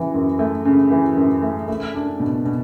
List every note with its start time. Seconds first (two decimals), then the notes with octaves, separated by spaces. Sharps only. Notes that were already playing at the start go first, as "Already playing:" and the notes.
Already playing: C#3 E3
0.14 F#2
0.39 A3
0.65 C#3
0.91 E3
1.16 F#2
1.42 A3
1.68 A3
1.95 D4
2.20 B2
2.45 B2